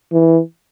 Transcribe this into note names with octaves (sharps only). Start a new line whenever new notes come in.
E3